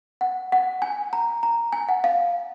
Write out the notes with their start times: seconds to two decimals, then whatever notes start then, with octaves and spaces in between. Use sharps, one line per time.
0.21 F#5
0.52 F#5
0.82 G#5
1.13 A#5
1.43 A#5
1.73 G#5
1.89 F#5
2.04 F5